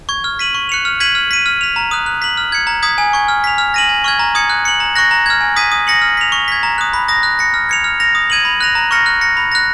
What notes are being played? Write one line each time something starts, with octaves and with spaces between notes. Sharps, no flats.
C#6 G#6
F6
B6 D#7 F#7
C#6
F#6 C#7 F7
F6
G#6 B6 D#7 F#7
F6
B6 D#7
F6
B6 F7
A#5
D#6 F#6
F#6
B6 F#7
F6
G#6 C#7
A#5
D#6 G#6 B6
G#5
C#6 G#6
F6
B6 F7
F6
A#6 D#7 F#7
G#5
C#6 F6 G#6
A#5
D#6 G#6 C#7
F#6
C#7 F#7
A#5
C#6 F#6 A#6
A#5
F6 G#6
G#5
D#6 G#6 B6 D#7
D#6
A#6 C#7 F#7
F6
B6 F7
C#6
G#6 B6
A#5
D#6 F#6
B5
D#6 A#6
F#6
A#6 C#7
F6
G#6 C#7 F7
F6
A#6 F7
D#6
G#6 D#7 F#7
B5
F#6 A#6 F7
A#5
C#6 F6 A#6 C#7
F#6
A#6 C#7
B5
F#6 A#6